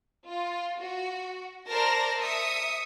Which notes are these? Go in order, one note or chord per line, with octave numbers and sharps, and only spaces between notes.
F4
F#4
A#4 C5 D5 A5 A#5 A#6
E5 D#6 C#7